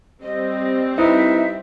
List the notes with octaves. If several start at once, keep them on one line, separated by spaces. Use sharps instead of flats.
G3 C4 D#5
D#4 E4 B4 E5